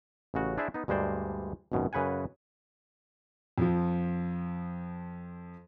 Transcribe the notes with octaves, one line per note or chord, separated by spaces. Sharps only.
A1 C#3 F#4
D4 E4 G#4 C5 D5 E5
B3 D#4
D2 G2 G#3 C5 D5
G#1 C#2 F#2 B2 D#3
F#2 C#3 B4 F#5 G#5
F2 F3